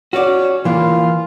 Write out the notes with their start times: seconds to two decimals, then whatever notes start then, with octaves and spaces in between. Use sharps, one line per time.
0.13 C#4 F#4 D5
0.65 E3 A#3 F4